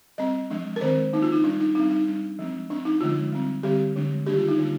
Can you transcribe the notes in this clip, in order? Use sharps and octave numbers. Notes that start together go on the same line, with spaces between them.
G3 C4 D#5
F3 G#3 D4
A#4
D#3 G#3 C4 C5
F3 A#3 D4 D#4
F4
D#4
G3 D4
D#4
G3 C4 D#4
D#4
G3 D4
F3 G#3 C4
F3 C4 D4
D#4
D3 F3 G#3 F4
G3 C4
D3 G3 C4 G4
D3 F3 G#3 D4
D#3 G3 A#3 D4 G4
F4
D#4
D3 G3 A#3 F4